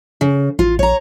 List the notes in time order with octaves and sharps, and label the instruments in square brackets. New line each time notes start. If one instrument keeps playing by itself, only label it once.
[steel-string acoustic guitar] C#3
[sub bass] A1 [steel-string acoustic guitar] F4
[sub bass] A#1 [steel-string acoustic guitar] C#5 A#5